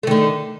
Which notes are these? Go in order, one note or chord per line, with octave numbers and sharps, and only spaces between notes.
D3 D#3 A3